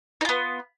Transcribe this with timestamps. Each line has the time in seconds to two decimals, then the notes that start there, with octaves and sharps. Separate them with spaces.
0.21 D#4
0.25 F4
0.29 B3